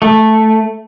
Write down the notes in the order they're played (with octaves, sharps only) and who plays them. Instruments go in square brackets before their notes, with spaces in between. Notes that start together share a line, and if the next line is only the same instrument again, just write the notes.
[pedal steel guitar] A3